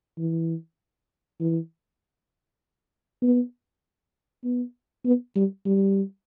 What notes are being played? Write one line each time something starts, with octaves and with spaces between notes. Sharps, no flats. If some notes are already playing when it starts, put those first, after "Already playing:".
E3
E3
B3
B3
B3
G3
G3